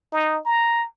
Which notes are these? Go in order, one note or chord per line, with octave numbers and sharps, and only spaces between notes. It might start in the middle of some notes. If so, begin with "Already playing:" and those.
D#4
A#5